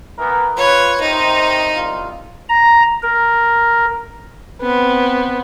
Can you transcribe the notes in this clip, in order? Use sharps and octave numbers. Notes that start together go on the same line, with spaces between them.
E3 B3 A#4
F4 B4 C#5
C3 D#3 D#4 C5
C2 F4
A#5
A#4
B3 C4